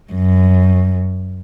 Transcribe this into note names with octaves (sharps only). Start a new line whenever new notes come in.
F#2